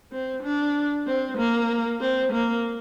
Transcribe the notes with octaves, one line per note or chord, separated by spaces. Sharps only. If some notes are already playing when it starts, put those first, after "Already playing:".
C4
D4
C4
A#3
C4
A#3